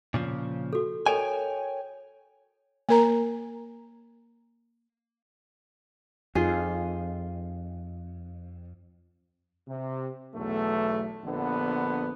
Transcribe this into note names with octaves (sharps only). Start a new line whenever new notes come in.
A#2 C#3 F3
F#4 A4
A4 A#4 C#5 D#5 G5 G#5
A#3 A#4 A#5
F2 D#4 F4 G#4
C3
B1 E2 A3
A#1 D3 B3